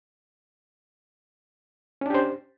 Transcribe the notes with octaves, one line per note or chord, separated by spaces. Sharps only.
C#4 D4 G4 C5